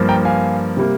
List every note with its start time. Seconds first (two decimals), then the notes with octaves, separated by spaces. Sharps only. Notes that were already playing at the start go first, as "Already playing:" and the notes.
Already playing: G2 F3 A#3
0.09 G5 A#5
0.25 F5 G#5
0.77 C3 G3 A#3